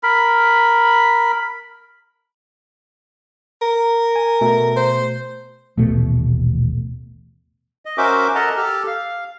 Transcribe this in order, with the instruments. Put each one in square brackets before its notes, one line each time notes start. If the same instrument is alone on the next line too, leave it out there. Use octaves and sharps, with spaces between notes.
[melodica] A#4 B5
[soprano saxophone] A#4
[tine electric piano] G#5
B2 A3
[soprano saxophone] C5
[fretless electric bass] D#1 A1 B2 A3
[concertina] D#5
C#4 F#4 A#4 C5 E5 D6
A4 A#4 D#5 F#5 A5 A#5
G4 A4 F6
F5